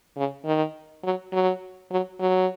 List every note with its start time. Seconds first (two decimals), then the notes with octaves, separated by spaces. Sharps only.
0.17 C#3
0.45 D#3
1.04 F#3
1.33 F#3
1.91 F#3
2.20 F#3